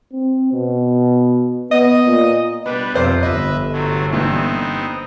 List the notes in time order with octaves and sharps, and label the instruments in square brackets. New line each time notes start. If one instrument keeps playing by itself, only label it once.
[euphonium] C4
B2
[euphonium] B3 [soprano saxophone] D#5
[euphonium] A#2
[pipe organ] G3 D4 B4 [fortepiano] B3
[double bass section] F2 F3 [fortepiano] C3 C5 D6 [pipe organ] F4
[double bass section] G1 [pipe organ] B4 E5 [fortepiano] D#5
[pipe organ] C3 F#3 A3
[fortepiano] G2 A#2 E3 [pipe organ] B3 C4 D#4